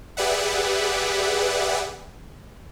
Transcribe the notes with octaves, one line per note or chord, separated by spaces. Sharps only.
G4 G#4 B4 D5 E5 F#5